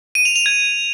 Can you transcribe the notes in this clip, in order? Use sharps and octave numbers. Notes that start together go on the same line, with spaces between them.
D#7
F7
F7
G#6